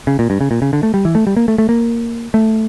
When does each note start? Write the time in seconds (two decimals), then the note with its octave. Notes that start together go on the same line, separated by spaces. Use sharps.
0.07 C#3
0.19 A#2
0.30 G2
0.41 C#3
0.51 A#2
0.62 C#3
0.73 D3
0.83 A3
0.94 G3
1.05 E3
1.15 A3
1.27 G3
1.36 A#3
1.48 A3
1.58 A3
1.69 A#3
2.34 A3